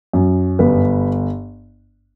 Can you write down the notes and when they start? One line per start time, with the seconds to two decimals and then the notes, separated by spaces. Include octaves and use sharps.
0.13 F#2
0.59 G1 B4